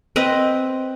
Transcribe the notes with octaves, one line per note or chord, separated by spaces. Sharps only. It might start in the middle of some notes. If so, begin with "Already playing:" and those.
C4 B4 D#5